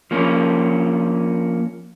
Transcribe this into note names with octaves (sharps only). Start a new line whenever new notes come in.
F3 A#3 C#4